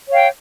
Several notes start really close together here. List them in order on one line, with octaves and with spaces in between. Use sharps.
C#5 F5 G5